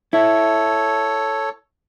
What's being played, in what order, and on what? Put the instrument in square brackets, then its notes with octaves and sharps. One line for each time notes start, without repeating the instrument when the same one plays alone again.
[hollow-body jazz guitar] E4 [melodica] A4 C#5